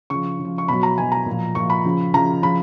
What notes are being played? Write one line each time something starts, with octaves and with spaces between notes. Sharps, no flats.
C#3 F3 C#6
C#3
F3
C#6
B2 F#3 B5
A#5
B2 F#3 G#5
A#5
A#2 F3
A#2 F3 C#6
B5
C#3 F3
C#3 F3 A#5
C#3 F3 B5